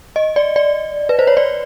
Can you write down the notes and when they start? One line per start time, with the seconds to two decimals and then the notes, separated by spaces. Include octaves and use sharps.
0.16 D#5
0.36 D5
0.56 D5
1.09 B4
1.19 C5
1.27 C#5
1.37 D5